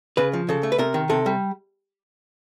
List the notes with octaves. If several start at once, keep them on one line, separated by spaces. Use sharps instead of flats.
C#3 B4
F3
C#3 A4
A3
B4
C3 A#4
D#3
C3 A4
G3